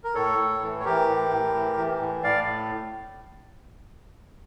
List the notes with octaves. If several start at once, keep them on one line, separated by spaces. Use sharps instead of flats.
A#4
A2 A4 C#5
A2
E3
C#5
E3 G4 A#4
A2
A2
E3
E3
A2
A2 D5 F5